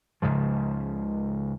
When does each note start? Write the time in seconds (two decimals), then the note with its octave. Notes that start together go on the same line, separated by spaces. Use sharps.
0.22 C#2 G#2 C#3 F3